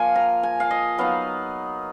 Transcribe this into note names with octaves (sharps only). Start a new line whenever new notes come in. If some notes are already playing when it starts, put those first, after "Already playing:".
Already playing: F3 A#3 F4 G#5
A#5
G#5
F5
D#5
F#3 B3 D#4 F5